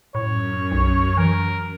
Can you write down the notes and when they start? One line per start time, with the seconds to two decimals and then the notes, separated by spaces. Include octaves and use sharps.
0.15 F#2 A2 C#5
0.72 B1
1.17 E3 A#4